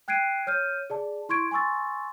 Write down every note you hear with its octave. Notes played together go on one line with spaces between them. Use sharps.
G5 F#6 G#6 C7 D7 D#7
C#5 F6 G6 D#7
G#4 D5 A5
E4 C6 C#6 G#6 D7
G#5 C6 C#6 E6 A6